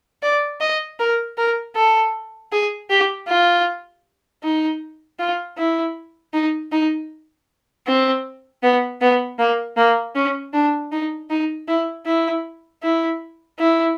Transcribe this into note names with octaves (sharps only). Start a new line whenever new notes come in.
D5
D#5
A#4
A#4
A4
G#4
G4
F4
D#4
F4
E4
D#4
D#4
C4
B3
B3
A#3
A#3
C#4
D4
D#4
D#4
E4
E4
E4
E4